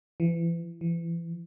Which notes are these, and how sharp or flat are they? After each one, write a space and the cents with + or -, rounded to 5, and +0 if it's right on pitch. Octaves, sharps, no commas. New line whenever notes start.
E3 +30
E3 +30